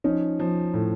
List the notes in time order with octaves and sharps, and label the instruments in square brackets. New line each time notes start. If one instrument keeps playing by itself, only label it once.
[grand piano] F3 C#4 D#4
F3
A2